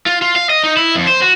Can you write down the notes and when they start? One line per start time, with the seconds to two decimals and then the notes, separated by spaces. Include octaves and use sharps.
0.06 F4
0.22 F4
0.36 F5
0.50 D#5
0.64 D#4
0.77 E4
0.95 F2
1.07 C5
1.22 F#4